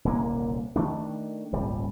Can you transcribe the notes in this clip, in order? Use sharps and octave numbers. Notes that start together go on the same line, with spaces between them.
D#1 C2 D3 A#3
D#3 A3 D4
D#1 G#1 C#2 G3